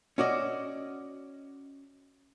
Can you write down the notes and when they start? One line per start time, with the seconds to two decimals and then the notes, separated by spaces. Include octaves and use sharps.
0.18 C#4 F#4 D5 D#5